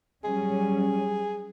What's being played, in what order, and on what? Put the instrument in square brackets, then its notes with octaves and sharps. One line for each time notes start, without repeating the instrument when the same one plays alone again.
[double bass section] F#3 G3 C#4 [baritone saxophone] G#4